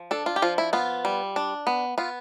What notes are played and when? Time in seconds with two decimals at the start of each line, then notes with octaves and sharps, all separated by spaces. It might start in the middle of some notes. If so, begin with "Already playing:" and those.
Already playing: F3
0.11 D4 A4
0.26 F4
0.36 G4
0.42 F3 F4
0.58 E4
0.73 B3 F4
1.05 G3
1.36 D4
1.67 B3
1.98 B3 F4